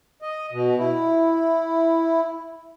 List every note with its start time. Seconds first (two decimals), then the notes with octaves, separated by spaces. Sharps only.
0.22 D#5
0.53 B2
0.78 E4